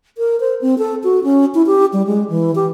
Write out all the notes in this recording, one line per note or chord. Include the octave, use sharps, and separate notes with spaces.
A#4
C5
C4
A4
F#4
C#4
E4
G4
G3
G#3
E3
G4